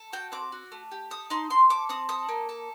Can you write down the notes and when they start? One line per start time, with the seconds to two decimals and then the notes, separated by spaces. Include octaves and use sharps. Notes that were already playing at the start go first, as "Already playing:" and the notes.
Already playing: A4
0.13 F#4 G5
0.32 C4 D6
0.52 F#4
0.72 A3
0.92 G4
1.11 A4 D#6
1.30 D#4 C6
1.50 C4 C6
1.69 A4 D6
1.89 C4 D#6
2.09 A4 D#6
2.29 A#3
2.49 A4